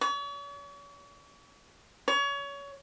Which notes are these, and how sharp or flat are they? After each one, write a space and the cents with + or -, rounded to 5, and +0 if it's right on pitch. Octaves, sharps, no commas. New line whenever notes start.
C#5 +40
C#5 +25